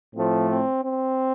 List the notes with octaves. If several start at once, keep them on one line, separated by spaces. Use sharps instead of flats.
A2 F3 A3 C4
C4
C4